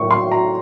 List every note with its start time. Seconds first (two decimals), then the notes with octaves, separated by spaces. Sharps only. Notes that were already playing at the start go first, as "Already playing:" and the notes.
Already playing: A2 F#3 A#3 C#4 E4 C#6
0.11 C6
0.32 A#5